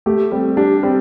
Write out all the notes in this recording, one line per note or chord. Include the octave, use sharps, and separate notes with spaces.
A3 G4
G3 C4
D4 G4
G3 C4